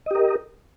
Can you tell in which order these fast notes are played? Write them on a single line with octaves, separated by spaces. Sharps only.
D#5 G4 A#4